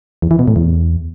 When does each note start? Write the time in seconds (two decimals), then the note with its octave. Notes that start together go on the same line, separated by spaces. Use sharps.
0.22 E2
0.31 E3
0.39 B2
0.48 A2
0.56 E2